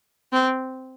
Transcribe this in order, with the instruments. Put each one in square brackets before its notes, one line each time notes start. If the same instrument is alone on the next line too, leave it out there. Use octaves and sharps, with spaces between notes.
[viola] C4